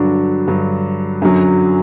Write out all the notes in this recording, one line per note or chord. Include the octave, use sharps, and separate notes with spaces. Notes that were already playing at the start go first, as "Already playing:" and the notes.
Already playing: G2 D3 F#3 D4 F#4
G2 D3 F#3
F#2 D3 F#3